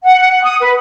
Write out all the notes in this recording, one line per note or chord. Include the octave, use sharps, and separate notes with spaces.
F#5
D#6
B4